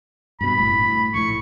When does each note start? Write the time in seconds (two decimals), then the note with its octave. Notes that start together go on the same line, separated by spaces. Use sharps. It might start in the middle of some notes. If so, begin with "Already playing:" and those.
0.41 G2 B2 B5
0.59 F#1 A2
0.74 A2
1.14 A#1 A2 C#6